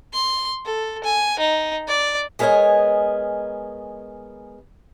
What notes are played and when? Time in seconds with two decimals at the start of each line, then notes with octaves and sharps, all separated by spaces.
0.14 C6
0.66 A4
1.04 G#5
1.39 D#4
1.88 D5
2.39 G#3 B3 A#4 C#5 D#5 G#5